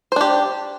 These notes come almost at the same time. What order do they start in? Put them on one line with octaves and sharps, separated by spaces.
C5 D4 G4